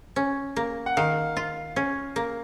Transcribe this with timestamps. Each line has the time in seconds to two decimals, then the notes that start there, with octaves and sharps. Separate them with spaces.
0.16 C#4
0.56 A#3
0.86 F#5
0.97 D#3 F5
1.37 F4
1.76 C#4
2.16 A#3